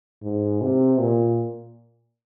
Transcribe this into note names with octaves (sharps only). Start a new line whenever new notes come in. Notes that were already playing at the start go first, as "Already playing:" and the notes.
G#2
C3
A#2